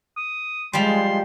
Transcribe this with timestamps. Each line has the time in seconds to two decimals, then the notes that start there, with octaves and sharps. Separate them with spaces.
0.17 D#6
0.73 F3 G3 G#3 C6